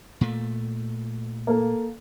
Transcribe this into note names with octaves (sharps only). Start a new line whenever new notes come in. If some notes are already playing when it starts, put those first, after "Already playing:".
A#2 A3
A#3 A4